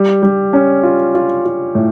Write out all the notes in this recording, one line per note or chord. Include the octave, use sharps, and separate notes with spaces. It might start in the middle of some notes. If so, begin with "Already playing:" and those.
Already playing: G3
G3
C#4
F4
F4
F4
A2